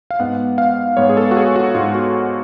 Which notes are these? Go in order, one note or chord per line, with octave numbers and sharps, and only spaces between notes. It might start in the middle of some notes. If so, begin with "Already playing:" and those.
F5
G#2 G#3 B3 F#5
F5
G#2 G#3 B3 C#5
G#4
A4
F#4
G#4
F#4
G#2 G#3 B3 F4
F#4